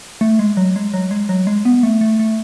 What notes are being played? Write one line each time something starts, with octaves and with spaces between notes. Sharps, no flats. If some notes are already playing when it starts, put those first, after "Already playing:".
A3
G#3
F#3
G#3
F#3
G#3
F#3
G#3
B3
A3
A3
A3